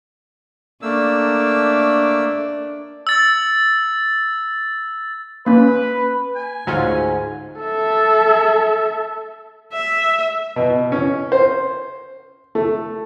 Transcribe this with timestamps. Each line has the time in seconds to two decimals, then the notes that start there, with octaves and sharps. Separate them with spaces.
0.82 A3 A#3 D4 E6
3.07 E6 A6
5.46 A#3 C#4 B4
6.36 G#5
6.67 D2 G#2 F#3 C#4 F4
7.61 A4 E5
9.73 E5
10.56 B2
10.92 C#4
11.32 C5
12.55 A3